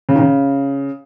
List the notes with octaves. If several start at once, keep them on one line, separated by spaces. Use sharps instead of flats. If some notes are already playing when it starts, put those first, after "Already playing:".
C#3
D#3
C#3